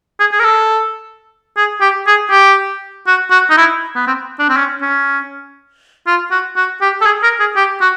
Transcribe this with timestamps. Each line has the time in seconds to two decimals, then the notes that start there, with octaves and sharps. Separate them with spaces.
0.20 G#4
0.32 G#4
0.40 A#4
0.44 A4
1.57 G#4
1.81 G4
2.07 G#4
2.31 G4
3.07 F#4
3.31 F#4
3.50 D#4
3.57 E4
3.95 B3
4.07 C4
4.39 D4
4.49 C4
4.57 C#4
4.82 C#4
6.07 F4
6.31 F#4
6.57 F#4
6.82 G4
7.01 A4
7.06 G#4
7.23 A#4
7.40 G#4
7.56 G4
7.81 F#4